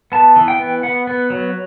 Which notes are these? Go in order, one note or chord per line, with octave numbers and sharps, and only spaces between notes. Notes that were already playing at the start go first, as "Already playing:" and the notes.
B3 A5
E3
G5
B3
B3 F#5
B3
F#3